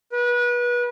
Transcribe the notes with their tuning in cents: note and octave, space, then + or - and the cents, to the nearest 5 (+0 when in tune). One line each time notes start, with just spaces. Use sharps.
B4 -30